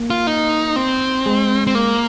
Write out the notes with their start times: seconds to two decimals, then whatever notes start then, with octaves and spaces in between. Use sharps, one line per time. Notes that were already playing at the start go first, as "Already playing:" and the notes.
Already playing: A#3
0.10 F4
0.27 D#4
0.76 C4
1.26 G#3
1.67 C4
1.75 A#3